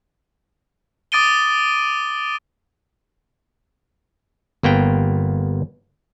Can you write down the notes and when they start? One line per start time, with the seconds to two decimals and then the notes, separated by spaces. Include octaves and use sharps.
1.12 D6 D#6 A6 D7 D#7 G7
4.63 G1 A#3 B3 G5